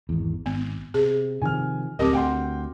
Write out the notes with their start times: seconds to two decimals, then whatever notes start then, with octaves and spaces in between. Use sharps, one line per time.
0.09 G#1 E2
0.46 G#1 B3
0.94 C3 G#4
1.42 C3 D#3 F3 G#5 F6
1.99 D1 C4 G4 A#4 D#5 D6
2.13 D2 F#5 G5 C6